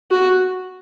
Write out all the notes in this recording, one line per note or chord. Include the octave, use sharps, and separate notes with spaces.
F#4